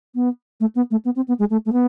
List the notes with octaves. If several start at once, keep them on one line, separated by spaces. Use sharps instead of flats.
B3
A3
B3
A3
B3
C4
B3
G#3
A3
A3
B3